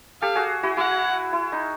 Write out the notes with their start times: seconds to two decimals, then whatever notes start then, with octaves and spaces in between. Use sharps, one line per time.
0.22 G4 A4 F5
0.35 F#4 G#4
0.63 E4 F#4
0.77 E4 F#4 F#5
1.33 E4
1.52 D#4